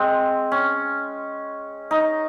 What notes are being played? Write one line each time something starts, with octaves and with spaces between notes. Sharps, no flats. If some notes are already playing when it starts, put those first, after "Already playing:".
Already playing: G#3 C4
C#4
D#4